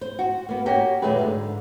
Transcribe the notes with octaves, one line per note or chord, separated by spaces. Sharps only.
C5
F#4
A#3 B3
A#3 C#4 F#4 G4
D#2 A#2 F#3 A3 G#4 B4
G#2 D3